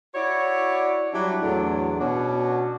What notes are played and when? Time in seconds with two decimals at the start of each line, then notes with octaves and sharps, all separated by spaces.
0.14 E4 F#4 C#5 D5
1.13 F#3 G3 D4 E4
1.42 E2 A2 F#3 A3 D4
2.00 B2 C#4 D4 F#4